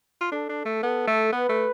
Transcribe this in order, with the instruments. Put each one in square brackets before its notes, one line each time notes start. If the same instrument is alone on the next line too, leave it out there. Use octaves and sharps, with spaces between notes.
[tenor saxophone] F4
[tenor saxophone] D4 [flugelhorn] A4
[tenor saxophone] D4
A3
[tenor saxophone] B3 [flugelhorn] A4
[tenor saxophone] A3
[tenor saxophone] B3 [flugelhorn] B4
[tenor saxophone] A3